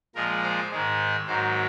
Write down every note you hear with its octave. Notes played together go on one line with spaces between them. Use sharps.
A#2 F3 G#3 A#4
C5
G#2 D#3 G#3
G#2 D#3 F#3 C5